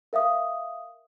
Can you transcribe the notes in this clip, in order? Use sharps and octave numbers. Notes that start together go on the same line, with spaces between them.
A#4 E5 F5 D#6